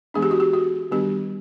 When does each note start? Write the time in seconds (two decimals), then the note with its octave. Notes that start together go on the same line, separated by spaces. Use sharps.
0.14 E3 G#3 B3 D4 G#4
0.22 G4
0.31 F#4
0.40 G4
0.53 F#4
0.91 D#3 G3 B3 D4 G4